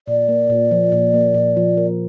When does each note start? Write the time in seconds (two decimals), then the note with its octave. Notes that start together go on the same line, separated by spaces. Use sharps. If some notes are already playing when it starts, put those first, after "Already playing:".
0.08 A#2 D5
0.29 A#3
0.50 A#2
0.71 F3
0.92 A#2
1.14 A#3
1.34 A#2
1.57 F3
1.77 A#4